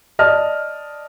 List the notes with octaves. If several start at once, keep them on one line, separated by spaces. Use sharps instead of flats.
D5 D#5 A5 F6